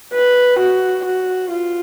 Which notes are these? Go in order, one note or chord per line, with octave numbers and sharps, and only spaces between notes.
B4
F#4
F#4
F4